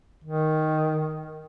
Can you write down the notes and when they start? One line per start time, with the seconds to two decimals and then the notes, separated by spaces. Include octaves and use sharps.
0.24 D#3